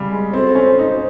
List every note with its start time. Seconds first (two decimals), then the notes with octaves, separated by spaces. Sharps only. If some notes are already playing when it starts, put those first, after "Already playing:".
Already playing: C#3 G3
0.12 G#3
0.34 C4 F#4 A4 C5
0.55 C#4
0.79 D#4